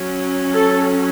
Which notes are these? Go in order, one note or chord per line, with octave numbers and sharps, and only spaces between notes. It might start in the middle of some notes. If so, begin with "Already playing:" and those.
Already playing: F#3 C#4
A4